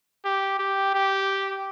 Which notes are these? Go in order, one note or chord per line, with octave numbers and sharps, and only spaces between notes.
G4
G4
G4